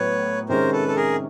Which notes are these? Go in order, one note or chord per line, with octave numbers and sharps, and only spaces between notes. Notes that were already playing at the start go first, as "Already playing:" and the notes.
Already playing: A2 F#3 B3 B4 C#5
C3 D#3 G#3 C#4 A#4 C5
A4 B4
A4
G#4 A#4